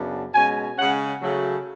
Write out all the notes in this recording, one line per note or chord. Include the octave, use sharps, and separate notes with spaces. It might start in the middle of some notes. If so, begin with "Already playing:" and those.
Already playing: F#2 C#3 B3 D4
B2 G#3 C#4 G#5
C#3 G#3 C#4 F#5
C#3 F#3 A3